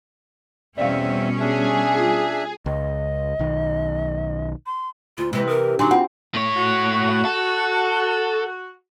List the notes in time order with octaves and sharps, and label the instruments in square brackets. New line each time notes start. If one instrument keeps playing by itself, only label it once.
[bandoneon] E2 C4 E5 [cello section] B2 G3 C#4 [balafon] D5 F5
[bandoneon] D4 E5 [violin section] G#4
[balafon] F4
[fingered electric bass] C#2 [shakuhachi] D#5
[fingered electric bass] B1 D#3
[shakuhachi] C6
[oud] D2 [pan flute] F4
[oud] C3 E3 [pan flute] G#3
[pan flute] A#4 [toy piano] D#6
[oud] D3 F#3 [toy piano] D4 C6 D6 [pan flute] D#4
[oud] C4 [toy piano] F4 F#4 F#5
[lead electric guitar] A2 C#5
[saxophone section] F#4
[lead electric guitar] A4